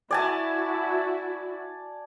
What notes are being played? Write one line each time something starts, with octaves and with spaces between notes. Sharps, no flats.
E4 F#4 D5 G#5 A5